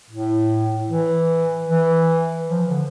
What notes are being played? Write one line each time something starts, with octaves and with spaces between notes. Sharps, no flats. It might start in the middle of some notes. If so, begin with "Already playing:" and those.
A2
E3
E3
F3
D3